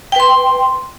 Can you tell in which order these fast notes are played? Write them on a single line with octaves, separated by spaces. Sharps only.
G5 B4 C6